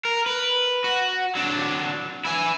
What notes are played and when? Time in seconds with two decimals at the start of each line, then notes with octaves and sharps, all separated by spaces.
0.05 A#4
0.26 B4
0.84 F#4
1.35 F#3 D4
2.25 E4 G#5